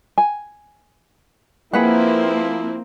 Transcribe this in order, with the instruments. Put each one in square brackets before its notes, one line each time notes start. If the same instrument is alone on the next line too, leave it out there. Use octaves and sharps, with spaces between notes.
[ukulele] G#5
[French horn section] F3 E4 [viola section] A#3 C4 [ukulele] G#4 B4 F#5